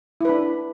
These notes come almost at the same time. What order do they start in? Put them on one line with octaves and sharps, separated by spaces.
E4 B4 D4